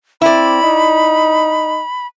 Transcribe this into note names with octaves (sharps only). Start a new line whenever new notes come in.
C4 E4 D5 B5
D#4